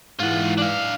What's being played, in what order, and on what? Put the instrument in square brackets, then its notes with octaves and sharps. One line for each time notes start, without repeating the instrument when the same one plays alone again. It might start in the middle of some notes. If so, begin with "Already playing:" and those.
[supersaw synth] G#2 E3 [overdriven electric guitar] F4 F#5
[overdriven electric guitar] D4 F5